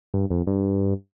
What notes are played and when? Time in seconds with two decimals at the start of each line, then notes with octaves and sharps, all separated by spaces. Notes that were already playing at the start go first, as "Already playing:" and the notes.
0.14 G2
0.30 F2
0.47 G2